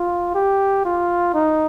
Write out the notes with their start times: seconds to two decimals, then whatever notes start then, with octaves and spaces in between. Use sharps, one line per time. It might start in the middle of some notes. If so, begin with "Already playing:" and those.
Already playing: F4
0.35 G4
0.85 F4
1.34 D#4